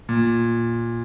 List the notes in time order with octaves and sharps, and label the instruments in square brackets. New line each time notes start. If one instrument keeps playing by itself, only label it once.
[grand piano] A#2